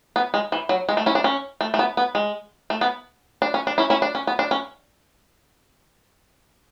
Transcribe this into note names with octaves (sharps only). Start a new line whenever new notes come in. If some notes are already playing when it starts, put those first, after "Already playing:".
B3
G#3
E3
F#3
G#3
A3
C#4 E4
D4
C#4
A3
A3
B3
B3
G#3
A3
B3
D4
C#4
D4
C#4 E4
C#4 E4
D4
C#4
B3
D4
C#4